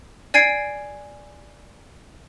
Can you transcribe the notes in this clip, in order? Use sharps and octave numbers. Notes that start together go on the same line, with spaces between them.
D5 G#5 G#6 C7 D7